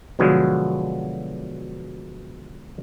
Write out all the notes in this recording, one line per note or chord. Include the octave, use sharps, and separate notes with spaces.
B2 D3 F3 F#3 G#3